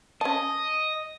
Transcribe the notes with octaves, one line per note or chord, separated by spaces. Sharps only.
C#4 D#5 A5